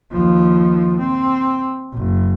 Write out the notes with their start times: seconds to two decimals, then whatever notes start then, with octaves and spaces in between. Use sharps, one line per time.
0.11 D#2 F3
0.99 C4
1.93 F#1